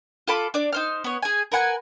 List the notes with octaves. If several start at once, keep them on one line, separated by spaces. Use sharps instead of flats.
F4 A4 B5 D6
D4 D5
D#4 C5 F6
B3 C#5
G#4 G#5
A#4 B4 F#5 G#5